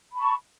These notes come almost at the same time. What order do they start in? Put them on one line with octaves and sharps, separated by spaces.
B5 A5 C#6